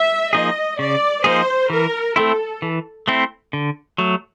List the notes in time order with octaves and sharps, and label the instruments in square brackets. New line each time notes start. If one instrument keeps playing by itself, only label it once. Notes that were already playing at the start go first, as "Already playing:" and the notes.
Already playing: [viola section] E5
[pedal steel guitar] F3 A#3 D#4 G#4 [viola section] D#5
[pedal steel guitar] C#3 [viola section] D5
[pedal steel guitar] F3 A#3 D#4 G#4 [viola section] C5
[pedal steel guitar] E3 [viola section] A#4
[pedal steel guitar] A3 C4 E4 [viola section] A4
[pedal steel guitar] E3
A3 C4 E4
D3
F#3 A3